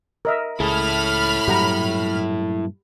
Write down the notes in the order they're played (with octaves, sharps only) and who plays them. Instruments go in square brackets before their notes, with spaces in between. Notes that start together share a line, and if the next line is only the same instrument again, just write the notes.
[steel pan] A#4 D#5 E5
[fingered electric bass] C#2 [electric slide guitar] E4 A4 [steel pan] G#4 [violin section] B5 F6
[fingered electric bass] G2 A#2 F#3 [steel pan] G4 F#5 A#5